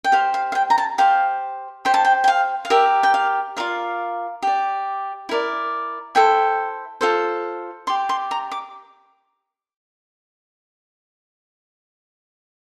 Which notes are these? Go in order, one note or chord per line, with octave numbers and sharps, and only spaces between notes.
G5
G4 C5 F5
F5
F5
G5
A#5
A5
G4 C5 F5
G4 C5 G5
A5
G5
G5
F5
F5
G4 A#4 D5 E5
G5
F5
F4 A#4 D5 F5
G4 D5
E4 A#4 D5
E4 A4 C5 G5
F4 A4 C5
G4 D5 C6
C6
A#5
D6